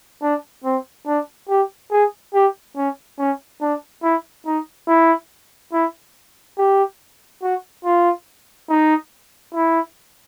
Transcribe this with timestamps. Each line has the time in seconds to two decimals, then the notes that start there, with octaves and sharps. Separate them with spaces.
0.22 D4
0.64 C4
1.06 D4
1.49 G4
1.91 G#4
2.34 G4
2.76 C#4
3.19 C#4
3.61 D4
4.03 E4
4.46 D#4
4.88 E4
5.73 E4
6.58 G4
7.42 F#4
7.85 F4
8.69 D#4
9.55 E4